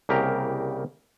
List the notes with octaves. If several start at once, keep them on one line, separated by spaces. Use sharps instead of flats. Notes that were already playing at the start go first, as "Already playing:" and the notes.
C2 C#3 A#3 G4 A#4 A#5